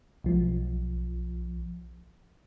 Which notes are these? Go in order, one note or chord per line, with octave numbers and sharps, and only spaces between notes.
B1 F3